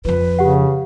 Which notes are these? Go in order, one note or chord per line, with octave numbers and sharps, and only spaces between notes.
F2 F3 B4
C#3 G4 F#5